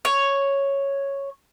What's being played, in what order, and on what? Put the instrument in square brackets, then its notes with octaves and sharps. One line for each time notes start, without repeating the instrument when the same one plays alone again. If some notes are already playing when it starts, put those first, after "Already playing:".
[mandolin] C#5